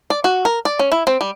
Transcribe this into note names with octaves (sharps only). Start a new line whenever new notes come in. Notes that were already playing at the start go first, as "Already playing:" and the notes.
D5
F#4
A#4
D5
C#4
E4
C4
G3